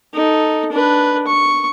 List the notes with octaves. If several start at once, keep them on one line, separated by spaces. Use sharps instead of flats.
D#4 A4
D4 B4
C#6